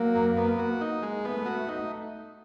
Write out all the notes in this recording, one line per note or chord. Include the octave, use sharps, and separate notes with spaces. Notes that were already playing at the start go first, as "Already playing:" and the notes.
Already playing: F#3 A#3
F#2
B3
F#4
D#4
G#3
A3 B3
F#4
D#4